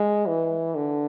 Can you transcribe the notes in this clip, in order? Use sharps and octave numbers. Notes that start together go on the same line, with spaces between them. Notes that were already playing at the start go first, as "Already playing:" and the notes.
Already playing: G#3
E3
D3